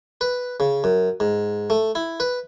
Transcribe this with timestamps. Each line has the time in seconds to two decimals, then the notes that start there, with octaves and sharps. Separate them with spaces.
0.21 B4
0.60 C#3
0.84 F#2
1.20 G#2
1.70 A3
1.95 E4
2.20 B4